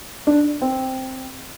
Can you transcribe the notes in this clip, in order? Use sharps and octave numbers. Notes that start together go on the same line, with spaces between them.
D4
C4